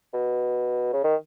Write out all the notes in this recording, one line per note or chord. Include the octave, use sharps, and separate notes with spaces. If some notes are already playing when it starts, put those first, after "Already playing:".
B2
C#3
D#3